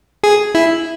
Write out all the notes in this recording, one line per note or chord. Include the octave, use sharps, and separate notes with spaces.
G#4
E4